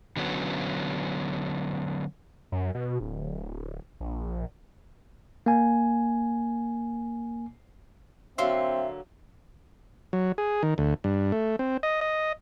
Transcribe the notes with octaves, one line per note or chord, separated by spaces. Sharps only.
D3 F#3 B3 C#4
F#2
B2
D1
A#1
A#3 G#5
D3 F#3 A#3 C4 E5 F5 C6 E6
F#3
G#4
D#3
D2
G2
A3
C4
D#5
D#5